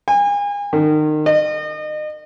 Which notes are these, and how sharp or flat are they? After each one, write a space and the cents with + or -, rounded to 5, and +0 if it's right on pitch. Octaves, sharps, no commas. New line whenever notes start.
G#5 -35
D#3 -30
D#5 -35